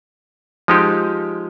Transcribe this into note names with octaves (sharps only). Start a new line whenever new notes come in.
F3 G#3 D#4 G4